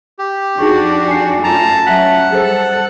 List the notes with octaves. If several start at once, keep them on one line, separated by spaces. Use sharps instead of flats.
G4
F2 D4 D#4 F#4 G#4 C#6
G#5 C7
F#2 A3 F4 A5 A#5
F#3 C#4 E5 F#5 A5 F#6 B6
G3 G#4 A4 C5